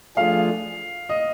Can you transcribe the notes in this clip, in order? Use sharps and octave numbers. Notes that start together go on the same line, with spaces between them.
F3 A3 D4 F4 G#4 F5
D#5